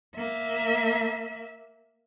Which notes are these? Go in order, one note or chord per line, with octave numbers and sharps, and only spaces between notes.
A#3 E5